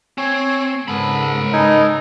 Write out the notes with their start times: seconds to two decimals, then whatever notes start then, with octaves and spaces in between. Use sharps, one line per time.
0.18 C4 C#5 G#5
0.88 G#2 C#3 B3 A4 A#4 B5
1.53 D#4 A4 B4 G#5